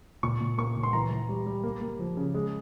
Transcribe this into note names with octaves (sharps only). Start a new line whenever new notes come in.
A#2 C#6
A#2
A#3 C#6
A#2
C6
E3 A#5
E3
G3
G3
A#3
A#3
F3
C#3
G#3